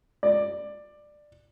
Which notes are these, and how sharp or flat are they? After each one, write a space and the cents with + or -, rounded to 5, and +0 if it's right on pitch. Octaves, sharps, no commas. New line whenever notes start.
D5 +15